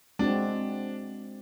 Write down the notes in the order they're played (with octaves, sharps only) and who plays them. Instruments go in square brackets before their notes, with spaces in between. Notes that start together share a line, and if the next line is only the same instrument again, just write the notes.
[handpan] G#3 C4 F#4 [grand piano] D4